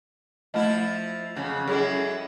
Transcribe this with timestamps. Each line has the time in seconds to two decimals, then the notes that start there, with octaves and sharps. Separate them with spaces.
0.54 F3 A3 E4 D#5
1.36 F2 C#3 F#3
1.68 F#2 G#3 E4 G#4 A4